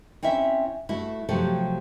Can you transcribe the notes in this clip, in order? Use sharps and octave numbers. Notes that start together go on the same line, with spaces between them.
C4 C#4 E4 E5
A3 E4 F#4 A4
C3 F3 F#3 A3 G4 A4